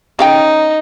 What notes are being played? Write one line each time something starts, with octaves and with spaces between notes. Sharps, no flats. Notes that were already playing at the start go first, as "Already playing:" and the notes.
C#3 D#4 F5 G5